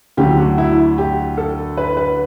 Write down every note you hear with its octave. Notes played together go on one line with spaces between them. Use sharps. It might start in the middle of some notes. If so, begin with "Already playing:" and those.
D2 D3 F#3 G4
F#4
E4
G4
A4
B4
B4